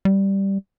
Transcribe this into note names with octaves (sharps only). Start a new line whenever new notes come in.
G3